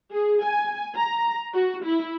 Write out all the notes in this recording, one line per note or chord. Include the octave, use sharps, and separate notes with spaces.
G#4
G#5
A#5
F#4
E4